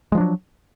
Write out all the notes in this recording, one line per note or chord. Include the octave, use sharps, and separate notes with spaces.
F3 F#3 G#3 D4